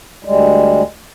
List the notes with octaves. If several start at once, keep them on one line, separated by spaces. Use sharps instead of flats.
D2 G3 G#3